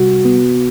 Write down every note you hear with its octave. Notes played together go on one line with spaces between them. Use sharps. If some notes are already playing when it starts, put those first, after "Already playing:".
Already playing: C3 G3 F#4
B3